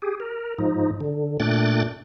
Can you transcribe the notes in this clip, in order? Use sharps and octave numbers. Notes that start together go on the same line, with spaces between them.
G4 G#4
A#4
G#2 F3 D#4
D3
A#2 A3 D4 G5 F#6 A6